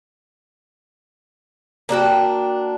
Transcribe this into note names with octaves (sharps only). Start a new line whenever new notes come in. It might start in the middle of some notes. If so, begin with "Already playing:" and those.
A#3 D4 F#4 G5